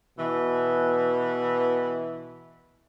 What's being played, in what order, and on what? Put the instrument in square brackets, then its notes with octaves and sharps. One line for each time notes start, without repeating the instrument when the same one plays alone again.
[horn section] B2 E3